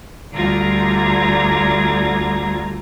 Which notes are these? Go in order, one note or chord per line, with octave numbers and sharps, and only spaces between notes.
D2 G3 F4 A#5 G#6 A#6